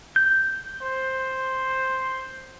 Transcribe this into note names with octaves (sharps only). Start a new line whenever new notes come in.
G6
C5